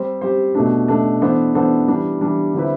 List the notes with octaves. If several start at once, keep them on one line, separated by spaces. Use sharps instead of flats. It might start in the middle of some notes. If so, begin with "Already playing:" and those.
Already playing: G3 C4 G4 C5
G3 C4 G4 C5
B2 A3 D4
B2 A3 D4
E3 B3 D4 A4 C5
E3 B3 D4 A4 C5
E3 G3 D4
E3 G3 D4
D3 G3 C4 E4 B4